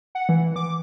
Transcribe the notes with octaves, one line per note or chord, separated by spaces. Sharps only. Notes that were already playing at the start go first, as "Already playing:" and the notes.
F#5
E3
D6